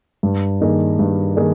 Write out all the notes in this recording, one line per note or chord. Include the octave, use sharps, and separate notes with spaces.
G2
D#3 A#3 D#4 G#4
G2
D#3 A#3 D#4 G#4